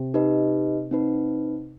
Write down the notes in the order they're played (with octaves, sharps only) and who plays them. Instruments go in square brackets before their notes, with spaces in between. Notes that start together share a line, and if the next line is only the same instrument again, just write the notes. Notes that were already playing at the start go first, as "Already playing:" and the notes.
Already playing: [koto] C3
[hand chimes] D#4 G4 B4 D#5
C4 D#4 B4